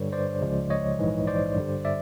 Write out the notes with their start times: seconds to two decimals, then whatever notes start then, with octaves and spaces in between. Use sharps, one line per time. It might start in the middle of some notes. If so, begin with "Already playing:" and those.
Already playing: G2 D3 G3 B4 C#5
0.12 C5 D5
0.41 C#2 C#3 F3 G#3
0.70 C#5 D#5
0.99 A#1 G#2 E3
1.27 C5 D5
1.56 G2 D3 G3
1.85 D5 E5